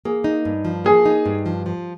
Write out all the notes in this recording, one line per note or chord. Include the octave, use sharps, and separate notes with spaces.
A#3 G#4
D#4
G2
F3
A#3 G#4
D#4
G2
F3
F3